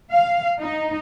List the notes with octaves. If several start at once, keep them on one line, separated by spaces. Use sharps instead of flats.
F5
D#4